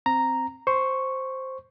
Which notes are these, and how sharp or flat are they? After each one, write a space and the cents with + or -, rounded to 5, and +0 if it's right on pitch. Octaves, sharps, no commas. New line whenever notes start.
C4 +0 A#5 +0
C5 +0 C#6 +0